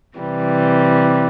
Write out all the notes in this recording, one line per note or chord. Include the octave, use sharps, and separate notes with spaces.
C3 E3 G3